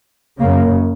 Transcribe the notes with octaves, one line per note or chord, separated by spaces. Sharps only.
F#2 C#3 A#3